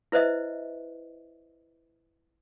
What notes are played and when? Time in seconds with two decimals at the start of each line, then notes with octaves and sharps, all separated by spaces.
0.12 E4 B4 C5 D#5 E5